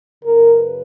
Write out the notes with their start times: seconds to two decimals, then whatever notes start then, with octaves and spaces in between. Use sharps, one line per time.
0.23 F#2 C#3 F#3 A#4
0.54 B4